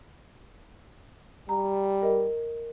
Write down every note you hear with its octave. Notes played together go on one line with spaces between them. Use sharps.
G3 A#5
A#4 D#5